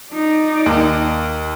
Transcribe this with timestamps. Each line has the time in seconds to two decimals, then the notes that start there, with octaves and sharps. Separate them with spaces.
0.13 D#4 D5
0.66 D#2